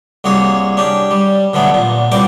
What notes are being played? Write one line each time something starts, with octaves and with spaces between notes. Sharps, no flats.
C2 A#3 F#4 G#4 C#5
C#4 D4 G4
G3
B2 D3 F#3 A3 B3
A#2
C2 A#2 F#3 B4 G5 D6